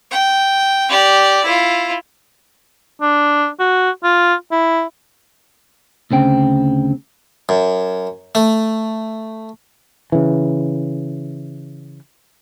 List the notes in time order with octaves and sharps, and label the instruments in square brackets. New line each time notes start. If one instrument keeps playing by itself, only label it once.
[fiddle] G5
G4 D5
E4 F4
[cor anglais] D4
F#4
F4
E4
[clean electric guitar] D2 C#3 C4 G5
[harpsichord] F#2
A3
[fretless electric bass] C#3 E3